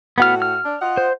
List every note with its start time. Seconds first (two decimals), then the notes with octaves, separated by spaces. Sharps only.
0.18 A2 B3 F#4 F#5 F6
0.42 F6
0.65 D4
0.80 F4 D#5 F#5
0.97 C5